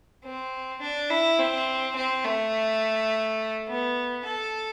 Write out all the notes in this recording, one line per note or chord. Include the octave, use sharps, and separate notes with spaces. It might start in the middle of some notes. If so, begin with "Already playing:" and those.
C4
D4
E4
C4
C4
A3
B3
A4